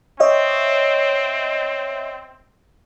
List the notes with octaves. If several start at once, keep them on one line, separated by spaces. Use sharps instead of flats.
C4 C#5 D#5 E5